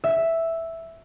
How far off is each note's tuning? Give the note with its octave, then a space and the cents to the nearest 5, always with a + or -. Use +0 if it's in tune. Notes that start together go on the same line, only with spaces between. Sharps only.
E5 +0